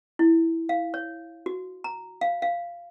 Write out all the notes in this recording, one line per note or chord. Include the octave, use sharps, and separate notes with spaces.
E4
F5
C#5
F#4
A#5
F5
F5